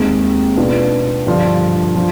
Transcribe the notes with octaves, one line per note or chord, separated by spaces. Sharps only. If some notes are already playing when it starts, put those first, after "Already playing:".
Already playing: D#2 D#3 G#3 C4
B2 B3 D4 F4
G2 D3 F3
F3